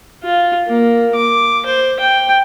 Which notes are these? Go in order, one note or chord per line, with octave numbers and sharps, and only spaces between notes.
F4
A#3
D6
C5
G5